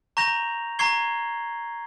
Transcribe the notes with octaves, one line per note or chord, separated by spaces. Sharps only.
A#5 C#6 G6 A#6 F7
A#5 C#6 G#6 C7 G7